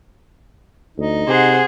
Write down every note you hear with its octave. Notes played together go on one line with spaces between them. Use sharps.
D2 D#4
C3 G#4 C5 F#5